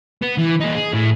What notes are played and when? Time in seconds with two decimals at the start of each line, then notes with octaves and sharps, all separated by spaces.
0.22 B3
0.38 E3
0.60 A#2 D#4
0.74 G#4
0.93 A2